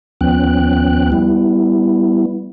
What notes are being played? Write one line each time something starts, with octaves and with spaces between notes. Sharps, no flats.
D#2 F3 B3 C#4 G5 F#6
G3 B3 E4